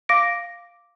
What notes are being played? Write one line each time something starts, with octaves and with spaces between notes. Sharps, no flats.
F5 D6 A#6 D7